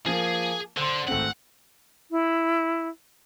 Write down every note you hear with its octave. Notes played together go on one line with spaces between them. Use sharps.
F3 A#3 G#4
D3 C5 C6
G#1 A3 C4 F#5
E4